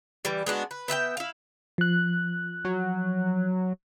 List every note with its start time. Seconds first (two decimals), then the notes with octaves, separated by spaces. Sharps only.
0.25 E3 G3
0.46 G#3 B3 D4 F#4
0.71 B4
0.88 B3 E5 F#5 G5
1.17 E4 F5
1.78 F3 F#6
2.65 F#3